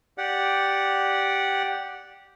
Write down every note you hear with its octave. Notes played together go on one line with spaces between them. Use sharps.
G4 D5 F#5